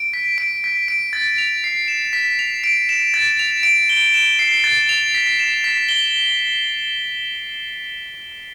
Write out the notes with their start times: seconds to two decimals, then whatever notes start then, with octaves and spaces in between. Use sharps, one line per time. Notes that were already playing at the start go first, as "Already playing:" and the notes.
Already playing: D7
0.13 B6
0.38 D7
0.64 B6
0.88 D7
1.13 A6
1.38 F7
1.64 C7
1.88 E7
2.13 B6
2.39 F7
2.64 D7
2.89 E7
3.14 A6
3.39 F7
3.63 D7
3.89 G7
4.14 E7
4.39 C7
4.64 A6
4.89 F7
5.14 B6
5.39 E7
5.64 B6
5.89 G7